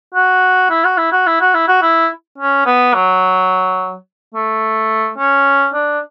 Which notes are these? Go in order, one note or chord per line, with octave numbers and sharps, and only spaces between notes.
F#4
E4
F#4
E4
F#4
E4
F#4
E4
F#4
E4
C#4
B3
F#3
A3
C#4
D4